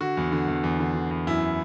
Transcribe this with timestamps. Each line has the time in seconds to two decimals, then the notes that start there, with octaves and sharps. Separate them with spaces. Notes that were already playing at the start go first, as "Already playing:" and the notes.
0.01 D3 F#4
0.17 E2
0.32 D3
0.48 E2
0.63 E2
0.80 D3
0.95 D3
1.11 E2
1.27 F#2 E4